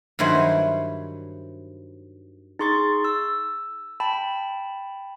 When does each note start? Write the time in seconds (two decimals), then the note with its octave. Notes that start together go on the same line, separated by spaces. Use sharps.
0.19 G2 D#3 F#3 E4 C5 G#5
2.59 D#4 G#4 C6 C#6 A6
3.04 E6
4.00 G5 A5 B5